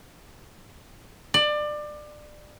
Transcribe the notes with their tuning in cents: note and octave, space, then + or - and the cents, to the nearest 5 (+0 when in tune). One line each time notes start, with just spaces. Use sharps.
D5 +25